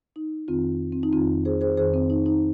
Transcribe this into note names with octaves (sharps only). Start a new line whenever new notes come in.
D#4
F2 D#3 C4 F4
C4
D#4
F2 D#3 C4 F4
G#4 C5
G#4 C5
F2 D#3 G#4 C5
C4
D#4
D#4